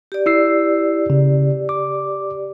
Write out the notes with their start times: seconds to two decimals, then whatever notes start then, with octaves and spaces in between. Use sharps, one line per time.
0.12 G4 D5
0.26 E4 E6 C7
1.10 C#3
1.69 D6